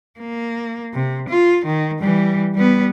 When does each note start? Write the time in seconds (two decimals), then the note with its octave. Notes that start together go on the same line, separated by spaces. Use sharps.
0.20 A#3
0.94 C3
1.29 F4
1.66 D#3
2.00 E3 G3
2.55 G3 B3